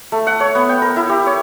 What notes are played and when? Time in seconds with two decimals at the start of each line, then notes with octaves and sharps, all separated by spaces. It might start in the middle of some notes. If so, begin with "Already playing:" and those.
0.12 A3
0.27 F#5
0.40 C#5
0.55 B3
0.69 G5
0.82 A#4
0.96 E4
1.09 G4
1.27 C#5